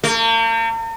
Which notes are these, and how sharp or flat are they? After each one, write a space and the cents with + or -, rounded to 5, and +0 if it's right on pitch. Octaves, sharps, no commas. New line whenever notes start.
A#3 -45